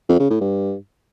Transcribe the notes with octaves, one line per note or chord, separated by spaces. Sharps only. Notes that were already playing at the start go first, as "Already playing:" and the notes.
F2
C#3
A2
G2